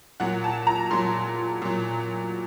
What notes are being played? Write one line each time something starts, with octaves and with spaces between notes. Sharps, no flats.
A#2 F#3 F#5
A5
A#5
A#2 F#3 C6
A#2 F#3